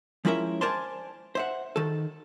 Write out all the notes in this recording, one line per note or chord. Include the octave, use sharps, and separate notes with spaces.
F3 G#3 C#4 E4 A#4 E5
A#4 C5 D5 G#5 A5 C6
C5 E5 F#5
D#3 A4